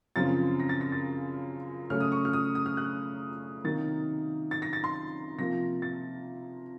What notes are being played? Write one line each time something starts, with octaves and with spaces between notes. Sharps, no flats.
F#2 C#3 F3 C4 A6
A#6
A6
A#6
A6
C#3 F#3 A3 C#4 F6
D#6
C#6
F6
D#6
D#6
F6
F#6
C3 D#3 F#3 A#3 A6
A6
A#6
A6
C6
C3 F3 A#3 A#6
A6